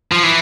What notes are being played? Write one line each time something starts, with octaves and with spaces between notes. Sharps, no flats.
F3
E3